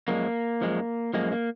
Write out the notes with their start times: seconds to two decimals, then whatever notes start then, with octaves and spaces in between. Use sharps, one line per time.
0.08 F#2 F3 G#3 A#3
0.61 F#2 F3 G#3
1.14 F#2 F3 G#3 A#3
1.32 A#3